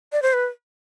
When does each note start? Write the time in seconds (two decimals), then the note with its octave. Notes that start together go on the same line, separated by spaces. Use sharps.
0.13 D5
0.22 C5
0.33 B4